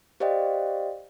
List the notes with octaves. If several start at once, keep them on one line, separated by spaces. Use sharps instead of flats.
G4 C5 D5 D#5 F5 G5